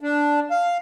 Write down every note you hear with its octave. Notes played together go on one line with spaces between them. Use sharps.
D4
F5